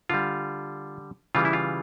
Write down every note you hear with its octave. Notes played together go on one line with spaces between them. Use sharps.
D3 G3 F4
C#3 E3 G3 F4
E4
F4